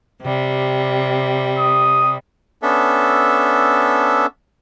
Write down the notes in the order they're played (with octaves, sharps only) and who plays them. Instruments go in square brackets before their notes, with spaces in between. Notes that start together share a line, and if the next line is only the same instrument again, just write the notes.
[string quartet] C3 G3
[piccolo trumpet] D#6
[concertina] B3 C#4 D4 A4 E5